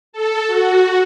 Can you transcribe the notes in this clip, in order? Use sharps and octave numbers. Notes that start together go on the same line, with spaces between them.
A4
F#4